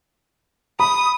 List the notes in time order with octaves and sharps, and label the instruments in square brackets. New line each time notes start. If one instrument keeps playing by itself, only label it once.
[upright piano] B5 [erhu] D#6